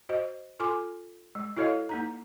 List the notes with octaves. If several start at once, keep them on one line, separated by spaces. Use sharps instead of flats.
F#4 C5 D#5
F4 A4 G#5 C6 D6
G#3
E4 F#4 A4 C#5 D#5 F5
A#3 D#4 A#5